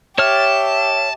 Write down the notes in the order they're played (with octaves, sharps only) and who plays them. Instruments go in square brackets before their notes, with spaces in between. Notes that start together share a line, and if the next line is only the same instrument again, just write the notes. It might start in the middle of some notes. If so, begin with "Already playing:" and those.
[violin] G4 [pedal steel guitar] C#5 F6 [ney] E5 [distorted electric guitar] A5